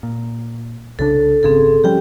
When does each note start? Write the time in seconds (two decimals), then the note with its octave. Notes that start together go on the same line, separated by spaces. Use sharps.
0.03 A#2
0.99 C2 C#3 D4 A4
1.43 G#1 C#3 C4 G#4 A4
1.84 F3 G3 C#4 G4 G5